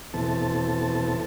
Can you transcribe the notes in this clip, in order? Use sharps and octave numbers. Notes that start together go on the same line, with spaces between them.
E2 B2 E3 C4 A4 A5